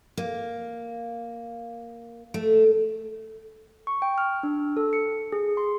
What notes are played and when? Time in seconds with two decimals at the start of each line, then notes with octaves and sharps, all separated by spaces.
0.17 A#3
2.34 A3
3.87 C#6
4.02 G5
4.18 F6
4.43 D4
4.77 A4
4.93 C#7
5.32 G#4
5.57 C6